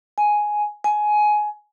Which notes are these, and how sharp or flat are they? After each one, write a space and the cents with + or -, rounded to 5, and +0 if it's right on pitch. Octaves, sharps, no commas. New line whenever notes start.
G#5 +5
G#5 +15